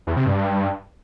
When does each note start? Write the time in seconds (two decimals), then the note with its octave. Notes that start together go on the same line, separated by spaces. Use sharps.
0.07 E2
0.17 C3
0.26 G2